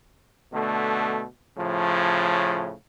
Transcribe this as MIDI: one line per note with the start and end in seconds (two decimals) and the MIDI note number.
0.52 1.25 47
0.52 1.25 50
0.52 1.25 57
1.57 2.72 45
1.57 2.72 49
1.57 2.72 53